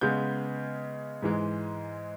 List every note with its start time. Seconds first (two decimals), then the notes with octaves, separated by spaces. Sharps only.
0.01 C#3 G#3 B3 G6
1.22 G#2 E3 G#3